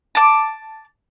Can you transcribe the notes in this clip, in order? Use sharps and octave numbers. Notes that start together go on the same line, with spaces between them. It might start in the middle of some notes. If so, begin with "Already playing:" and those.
A5 D6